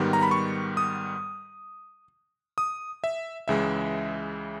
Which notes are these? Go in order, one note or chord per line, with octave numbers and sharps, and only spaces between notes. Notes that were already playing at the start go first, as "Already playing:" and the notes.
Already playing: G#2 D#3 G3 B3
A#5
B5
C#6
D#6
D#6
E5
C#2 C#3 E3 G#3 E5